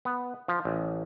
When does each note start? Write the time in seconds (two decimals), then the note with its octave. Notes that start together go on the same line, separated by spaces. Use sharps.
0.05 B3
0.48 F3
0.65 A1